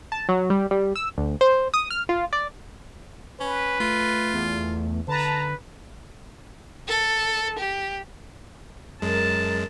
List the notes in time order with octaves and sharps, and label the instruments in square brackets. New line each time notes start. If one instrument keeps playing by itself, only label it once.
[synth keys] A5
F#3
G3
G3
E6
D2
C5
D#6
F6
F4
D5
[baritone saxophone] C#4 [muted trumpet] B4
[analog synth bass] A3 [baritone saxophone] F4
[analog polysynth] E2
[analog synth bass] D3 [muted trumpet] B4 [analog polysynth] A5 A#5
[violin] A4
G4
[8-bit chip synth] F#2 G#3 [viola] A#4 A5